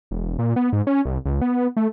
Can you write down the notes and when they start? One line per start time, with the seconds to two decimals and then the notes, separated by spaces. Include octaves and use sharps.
0.11 E1
0.39 A#2
0.56 B3
0.73 G#2
0.87 C#4
1.05 C2
1.25 C#2
1.42 B3
1.77 A3